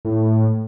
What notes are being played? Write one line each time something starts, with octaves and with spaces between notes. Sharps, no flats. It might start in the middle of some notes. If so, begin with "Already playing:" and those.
A2